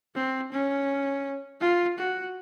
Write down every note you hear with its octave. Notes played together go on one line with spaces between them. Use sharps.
C4
C#4
F4
F#4